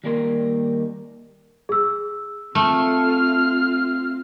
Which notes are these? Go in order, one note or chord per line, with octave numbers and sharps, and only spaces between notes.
D#3 G3 A#3 A#4 C6
G#4 E6
A3 C4 F4 F6